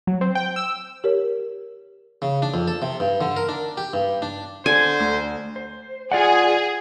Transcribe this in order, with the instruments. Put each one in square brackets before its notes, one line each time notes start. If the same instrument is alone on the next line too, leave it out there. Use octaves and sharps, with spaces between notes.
[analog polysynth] F#3
C4
G5
E6
[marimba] G4 A#4 C#5
[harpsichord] C#3
D4
F2
A4
C3
G2
D3
A#4
D4
G4
G2
D4
[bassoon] D3 [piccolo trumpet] C5 [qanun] G#5
[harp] D2
[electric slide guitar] C5
[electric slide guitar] F4 D5 F#5 [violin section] G#4